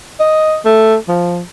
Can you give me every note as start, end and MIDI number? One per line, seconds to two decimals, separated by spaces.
0.20 0.57 75
0.65 0.96 57
1.08 1.40 53